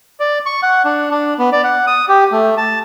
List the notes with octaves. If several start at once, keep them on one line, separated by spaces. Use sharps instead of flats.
D5
C#6
F#5
D4
D4
B3
D5
F#5
D#6
G4
A3
A5